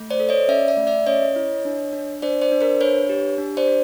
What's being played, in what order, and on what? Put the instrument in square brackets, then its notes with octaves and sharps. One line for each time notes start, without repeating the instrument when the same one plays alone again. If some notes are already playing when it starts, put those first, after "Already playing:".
Already playing: [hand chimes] A3
C5 D5
A4
C#5 D#5
C#4 D5 E5
D5 E5
A3
D5 E5
C#4 C#5 D#5
E4
D4
D4
D4 C5 D5
C5 D5
D4
A#4 C5
D4 B4 C#5
G4
D4
C5 D5
D4